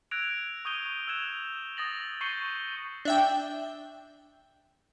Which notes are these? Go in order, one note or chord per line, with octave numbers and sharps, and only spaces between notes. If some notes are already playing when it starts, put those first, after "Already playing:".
E6 F#6 G#6 A#6 D7 F7
C#6 D#6 G6 G#6 D#7 G7
E6 F#6 G#6 E7 F7
D#6 A6 A#6 F#7
C#6 G6 C7 C#7 D#7 G7
D4 E5 G5